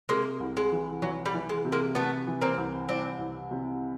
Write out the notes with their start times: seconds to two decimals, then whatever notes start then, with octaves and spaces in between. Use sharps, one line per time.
0.09 C3 G#3 A#3
0.40 C2
0.57 G#3
0.72 E3
1.02 E3 F#3
1.26 G3
1.34 E3
1.49 G#3
1.65 C3
1.72 G#3 A#3
1.95 C3 A3 B3
2.27 E3
2.41 A#3 C4
2.57 C2
2.89 C2 C4 D4
3.19 C2
3.51 C3